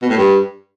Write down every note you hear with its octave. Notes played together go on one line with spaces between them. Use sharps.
B2
A2
G2